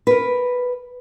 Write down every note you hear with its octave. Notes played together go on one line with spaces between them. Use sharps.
A#4 B4